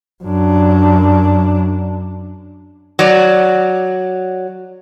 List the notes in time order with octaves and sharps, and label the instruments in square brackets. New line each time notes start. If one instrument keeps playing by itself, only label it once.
[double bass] F#2 D4
[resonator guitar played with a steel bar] F#3 D5